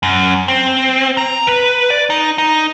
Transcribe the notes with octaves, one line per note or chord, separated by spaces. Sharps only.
F#2
C4
A#5
B4
D5
D#4
D#4